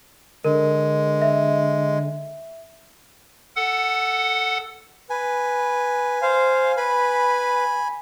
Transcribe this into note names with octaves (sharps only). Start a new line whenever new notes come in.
D3 G#3 A#4
E5
A4 F#5
B4 G#5
C5 F5
B4 G#5 B5